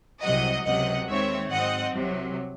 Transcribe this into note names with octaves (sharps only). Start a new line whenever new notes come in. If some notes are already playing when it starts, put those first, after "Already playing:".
C2 C3 F#3 D#5 F#5
C#2 C3 F#3 D#5 F#5
D#2 D#3 G#3 C4 C#5 E5
G#2 F#3 C4 D#5 F#5
C2 C3 F#3